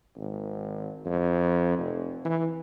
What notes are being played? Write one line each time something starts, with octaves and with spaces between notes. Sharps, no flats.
G#1
F2
F1
E3